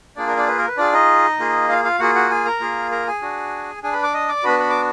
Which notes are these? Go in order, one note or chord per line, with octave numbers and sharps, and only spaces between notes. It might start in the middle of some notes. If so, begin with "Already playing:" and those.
A#3 D4 F4 G#4 D5
A#4
D4 D5
B4
A#4
B4
D4 F4 G#4 D5
D#4 D#5
A#3 F4 G#4
F4 F5
F4 F5
A#3 F4 F#4 G#4 F#5
F#4 F#5
G#4 G#5
A#4 A#5
A#3 F4 G#4
A#4 A#5
G#4 G#5
D4 F#4
D4 G#4 G#5
B4 B5
D5 D6
D#5 D#6
D5 D6
B3 D4 F#4 B4 B5
B5
D6